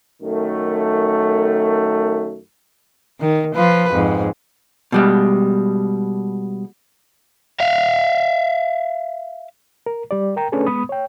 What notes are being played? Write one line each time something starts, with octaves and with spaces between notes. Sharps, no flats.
F#2 D#3 A3
D#3
F3 F4 B4
F2 G#2
B2 G3 G#3
E5 F5
A#4
G3 G4 D5
A#4 G5 A#5
A3 C#4 D4 G#4 A4 B4
G#3 B3 B5 D#6
C#5 G5